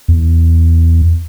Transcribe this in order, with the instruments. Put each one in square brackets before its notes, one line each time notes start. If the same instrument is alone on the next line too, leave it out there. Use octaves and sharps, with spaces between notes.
[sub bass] E2